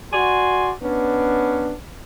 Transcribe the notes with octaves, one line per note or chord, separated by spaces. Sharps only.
F#4 D5 G#5 C6
B3 C#4 D4